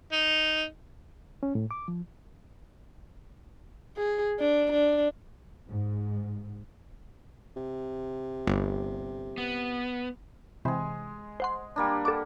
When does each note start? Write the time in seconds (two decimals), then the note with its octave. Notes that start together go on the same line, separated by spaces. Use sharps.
0.12 D#4
1.43 C#4
1.55 A2
1.71 D6
1.88 F3
3.97 G#4
4.40 D4
4.72 D4
5.69 G#2
7.56 C3
8.47 G1
9.38 B3
10.65 C3 E3 G#3 G#4
11.40 C5 F#5 C6
11.76 G3 A#3 D4
12.05 A4 F#5 D6